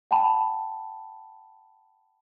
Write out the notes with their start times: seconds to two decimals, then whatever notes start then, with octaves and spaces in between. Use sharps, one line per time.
0.11 F#5 G5 A5 B5